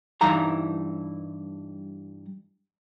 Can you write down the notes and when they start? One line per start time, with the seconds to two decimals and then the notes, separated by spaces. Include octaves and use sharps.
0.21 G2 E3 D#4 E4 F5 A#5